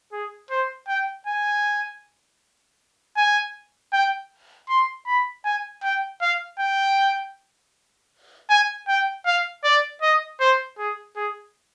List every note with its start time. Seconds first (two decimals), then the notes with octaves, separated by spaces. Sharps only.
0.12 G#4
0.51 C5
0.88 G5
1.27 G#5
3.17 G#5
3.93 G5
4.69 C6
5.07 B5
5.45 G#5
5.83 G5
6.22 F5
6.59 G5
8.50 G#5
8.88 G5
9.26 F5
9.64 D5
10.02 D#5
10.40 C5
10.78 G#4
11.16 G#4